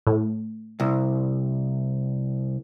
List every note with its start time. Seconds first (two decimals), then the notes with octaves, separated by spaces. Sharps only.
0.07 A2
0.80 C2